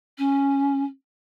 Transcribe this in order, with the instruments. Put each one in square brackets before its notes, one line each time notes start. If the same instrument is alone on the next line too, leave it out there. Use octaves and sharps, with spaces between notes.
[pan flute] C#4